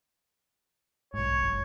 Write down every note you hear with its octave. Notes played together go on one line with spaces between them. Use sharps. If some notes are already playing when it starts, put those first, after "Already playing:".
B1 G#2 C#5
F#1